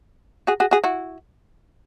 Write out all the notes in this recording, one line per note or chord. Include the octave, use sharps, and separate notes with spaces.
F#4 G#4
F#4 G#4
F#4 G#4
E4 F#4